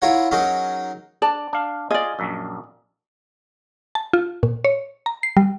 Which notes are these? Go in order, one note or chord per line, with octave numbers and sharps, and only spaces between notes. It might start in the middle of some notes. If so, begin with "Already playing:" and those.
E4 F4 A#4 C#5 F#5
F#3 C#4 D#4 G#4 A#4
D4 D5 A5
D4 F5
F4 G#4 D5 D#5
A#1 F#2
A5
F4
A#2
C#5
A#5
C7
G3